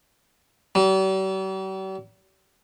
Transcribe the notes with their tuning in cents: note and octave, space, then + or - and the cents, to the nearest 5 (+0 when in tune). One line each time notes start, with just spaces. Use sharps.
G3 -45